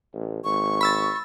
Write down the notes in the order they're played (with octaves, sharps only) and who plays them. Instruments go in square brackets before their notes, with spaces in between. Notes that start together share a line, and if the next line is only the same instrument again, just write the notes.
[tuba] A1
[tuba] G#1 [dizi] C#6
[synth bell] B5 E6 A6